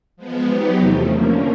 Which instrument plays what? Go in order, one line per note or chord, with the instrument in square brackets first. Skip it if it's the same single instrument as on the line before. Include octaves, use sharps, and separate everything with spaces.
[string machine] F3 G#3 B3
F#3 B3 D#4 G4
E2 C3 F3 A3
D3 F3 A#3 C#4